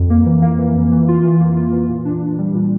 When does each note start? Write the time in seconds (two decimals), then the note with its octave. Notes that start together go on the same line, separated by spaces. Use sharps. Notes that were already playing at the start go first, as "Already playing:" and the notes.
Already playing: F2
0.10 A#3
0.26 E3
0.42 A#3
0.58 E3
0.75 F2
0.92 E3
1.08 F4
1.24 E3
1.41 A#3
1.57 F4
1.73 E3
1.89 A#2
2.05 D4
2.23 A#2
2.38 G3
2.54 A#2